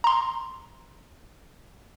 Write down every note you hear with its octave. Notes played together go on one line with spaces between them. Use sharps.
A#5 C6